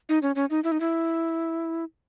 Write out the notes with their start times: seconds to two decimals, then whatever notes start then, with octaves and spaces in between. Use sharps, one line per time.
0.09 D#4
0.23 C#4
0.36 C#4
0.50 D#4
0.64 E4
0.72 D#4
0.80 E4